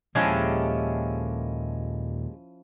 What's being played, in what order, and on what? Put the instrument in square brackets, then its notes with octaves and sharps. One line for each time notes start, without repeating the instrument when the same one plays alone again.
[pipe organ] D#2 A#2 [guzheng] F3 C#4 E4 [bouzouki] G#3 G4 A4